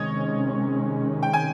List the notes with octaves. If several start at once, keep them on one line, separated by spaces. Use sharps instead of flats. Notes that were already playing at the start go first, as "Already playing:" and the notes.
Already playing: C3 D#3 G#3 C#4 C#5 D#5
G5
G#5